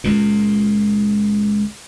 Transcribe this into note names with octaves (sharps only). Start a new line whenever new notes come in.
C#2 A#2